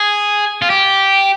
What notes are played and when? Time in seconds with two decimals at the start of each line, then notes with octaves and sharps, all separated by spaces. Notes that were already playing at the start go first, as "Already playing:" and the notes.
Already playing: G#4
0.62 F4
0.70 G4